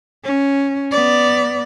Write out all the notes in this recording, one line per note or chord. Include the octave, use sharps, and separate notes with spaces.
C#4
B3 D5